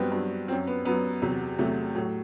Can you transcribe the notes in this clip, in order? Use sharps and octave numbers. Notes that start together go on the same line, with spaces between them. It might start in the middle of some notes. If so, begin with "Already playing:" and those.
Already playing: G2 F#3 B3 C4
G2 F#3
F#2 F#3 C4
B3
F#2 F#3 B3
E2 C3 F#3
E2 C3 F#3 A3
A2 F#3